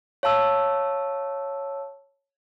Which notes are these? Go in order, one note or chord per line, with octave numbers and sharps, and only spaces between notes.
C#5 F5 A5 E6